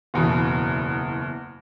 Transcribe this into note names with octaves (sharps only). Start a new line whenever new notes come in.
F#1 E2 B2